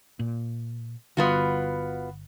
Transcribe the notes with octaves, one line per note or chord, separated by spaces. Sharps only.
A#2
G1 D3 G3 B3 F4 F#4